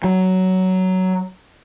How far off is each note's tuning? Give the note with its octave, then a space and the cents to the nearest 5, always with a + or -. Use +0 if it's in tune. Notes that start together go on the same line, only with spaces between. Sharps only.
F#3 +10